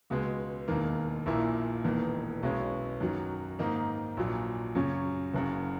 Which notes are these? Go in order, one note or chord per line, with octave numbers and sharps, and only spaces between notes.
C#2 B2 G#3
E1 D#2 D#3 A#3
A#1 A#2 A#3 E4
E1 E2 D#3 A#3
B1 B2 G#3 C#4
F#2 D#3 F#3
G#2 D#3 A#3 D#4
A#1 A#2 F#3
F#2 C#3 F#3 C#4
F#1 F#2 C#3